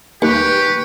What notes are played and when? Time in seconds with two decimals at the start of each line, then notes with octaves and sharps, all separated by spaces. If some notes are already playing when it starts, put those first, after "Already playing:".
0.22 D#2 G4 B4 C#6 F#6 C#7